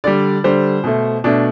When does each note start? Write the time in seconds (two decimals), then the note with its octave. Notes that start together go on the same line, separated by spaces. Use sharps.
0.04 D3 G3 D5
0.44 D3 G3 C5
0.84 B2 A3
1.24 B2 A3 D4